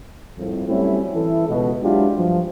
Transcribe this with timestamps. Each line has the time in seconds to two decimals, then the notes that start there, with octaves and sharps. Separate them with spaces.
0.38 C2 F2 A2
0.67 F#3 G3 A3 C4 C#4 E4
1.14 E3 E4 A4
1.48 C#2 B2
1.83 F#3 G#3 D4 E4 F4 G4
2.16 G2 F3